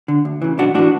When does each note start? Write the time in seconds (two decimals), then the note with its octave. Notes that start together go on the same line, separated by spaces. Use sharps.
0.08 D3
0.25 D2
0.42 C#3 E3
0.58 B1 D4 F#4
0.74 A2 E3 D4 F#4